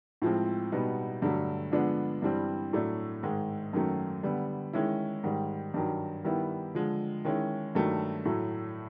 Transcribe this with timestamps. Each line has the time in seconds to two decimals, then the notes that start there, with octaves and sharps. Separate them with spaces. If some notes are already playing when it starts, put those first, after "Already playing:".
0.22 A2 F3 G#3 C4
0.72 B2 G3 B3 D#4
1.22 G2 D3 F#3 A3
1.72 D3 F3 G#3 B3 D4
2.22 G2 E3 G3 C4
2.73 A2 F#3 A3 D4
3.23 G#2 D#3 G#3
3.73 F#2 D#3 F#3 A3
4.23 D3 G3 B3
4.73 D#3 G#3 C#4 E4
5.23 G#2 D#3 G3
5.74 G2 D#3 F#3
6.24 D#3 G3 B3 E4
6.75 D3 F3 G#3
7.25 D#3 G#3 C#4 E4
7.75 G2 D#3 F#3 A3
8.25 A2 F#3 A3